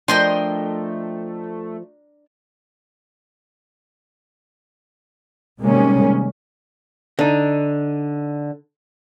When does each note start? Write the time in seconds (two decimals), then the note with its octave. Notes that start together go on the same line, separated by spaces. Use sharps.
0.08 F3 A3 D4 A#4 D#5 G5 C6
5.62 C3 D#3 G3 G#3 A#3 C#4
7.19 D3 D#4